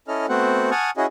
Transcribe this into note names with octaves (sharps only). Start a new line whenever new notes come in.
C#4 E4 A4 D#5 F6
A3 B3 C4 F#4 C5 F#5
F#5 G#5 A5 C#6 D#6 F6
C#4 E4 F#4 G#4 D#5